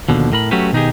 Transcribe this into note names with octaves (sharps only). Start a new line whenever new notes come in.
D#2 B2 D3 F3
A2 A#4 B5
F#3 A3 C#4 F#4 G4 B4
B2 D#3 D#4 F4 G4 G#4